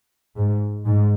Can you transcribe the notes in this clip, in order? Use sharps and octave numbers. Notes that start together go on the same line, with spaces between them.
G#2
G#2